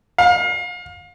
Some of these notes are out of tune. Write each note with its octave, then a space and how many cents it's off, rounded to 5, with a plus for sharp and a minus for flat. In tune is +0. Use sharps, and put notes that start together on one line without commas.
F5 +30